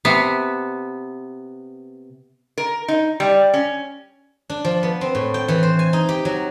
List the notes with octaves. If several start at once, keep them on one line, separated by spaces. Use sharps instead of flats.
C3 B3
A#4
D#4
G3
C#4
D4
F3
B3
C4
A2
G5
E3
C5
G#5
D#4
G4
F#3